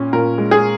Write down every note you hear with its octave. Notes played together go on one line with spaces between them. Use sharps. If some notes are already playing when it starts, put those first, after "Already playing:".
Already playing: A#2 C#4
A#2 A#4
G#3
G#4